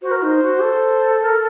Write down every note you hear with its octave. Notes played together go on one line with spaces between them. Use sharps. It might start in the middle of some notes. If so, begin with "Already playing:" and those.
F#4 C5
A#4
D#4 C5
F#4
A4
A#4